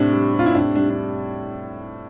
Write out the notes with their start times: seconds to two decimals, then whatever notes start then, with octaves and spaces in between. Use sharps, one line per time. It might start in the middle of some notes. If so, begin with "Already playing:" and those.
Already playing: A2 C3 D4
0.12 G3
0.34 C3
0.39 F4
0.46 E4
0.55 A2 D4
0.75 G3 D4
0.90 D4